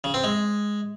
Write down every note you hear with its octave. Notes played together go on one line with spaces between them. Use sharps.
C#3
C4
G#3